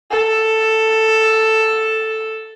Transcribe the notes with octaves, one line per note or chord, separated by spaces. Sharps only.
A4